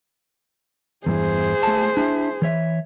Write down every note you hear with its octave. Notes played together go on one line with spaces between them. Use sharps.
E2 G2 E3 G#4 C5
A3 A4 A5
D4 E4
E3 C#5 E5